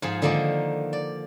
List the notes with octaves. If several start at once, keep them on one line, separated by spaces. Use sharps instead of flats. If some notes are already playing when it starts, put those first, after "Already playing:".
G#2 F3 G#4
D3 D#3 F3 A#3 D4 D#4
D5